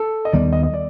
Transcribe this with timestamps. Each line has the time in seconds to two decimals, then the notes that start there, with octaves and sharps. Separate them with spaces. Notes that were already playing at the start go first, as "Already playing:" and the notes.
Already playing: A4
0.25 D#5
0.32 D#2 D#3 G3 B3 D5
0.53 D#5
0.63 D#5
0.74 D5